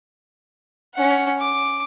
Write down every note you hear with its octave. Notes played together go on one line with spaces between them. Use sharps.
C#4 F#5
D6